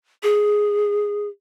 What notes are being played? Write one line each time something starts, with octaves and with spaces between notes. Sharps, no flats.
G#4